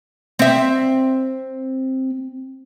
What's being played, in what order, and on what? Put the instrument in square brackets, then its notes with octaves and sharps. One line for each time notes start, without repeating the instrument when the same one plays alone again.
[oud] C4 E5